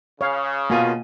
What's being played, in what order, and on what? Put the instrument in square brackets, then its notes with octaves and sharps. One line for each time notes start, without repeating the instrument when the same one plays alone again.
[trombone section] C#3 [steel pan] C#5 F5
[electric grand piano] B2 F4 [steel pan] A#3 G#5